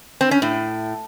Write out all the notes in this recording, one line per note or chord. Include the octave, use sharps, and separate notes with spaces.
C4
C#4
A2